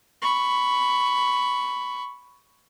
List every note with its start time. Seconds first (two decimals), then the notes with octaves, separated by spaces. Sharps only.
0.22 B5 C#6